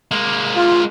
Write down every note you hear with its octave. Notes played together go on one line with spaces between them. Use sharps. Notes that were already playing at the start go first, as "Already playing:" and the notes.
G#3 A#3
F4